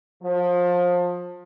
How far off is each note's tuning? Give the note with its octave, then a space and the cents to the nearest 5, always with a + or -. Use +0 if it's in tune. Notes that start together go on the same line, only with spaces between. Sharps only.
F3 +25